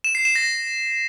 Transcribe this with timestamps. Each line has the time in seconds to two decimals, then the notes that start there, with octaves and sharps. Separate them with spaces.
0.04 E7
0.15 C7
0.25 E7
0.36 A#6